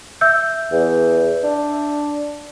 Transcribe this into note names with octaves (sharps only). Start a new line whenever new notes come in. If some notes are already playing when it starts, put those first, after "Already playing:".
E5 E6 G6
E2
D4